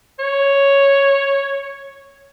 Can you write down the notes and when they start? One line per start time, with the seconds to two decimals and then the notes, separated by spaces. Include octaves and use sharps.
0.19 C#5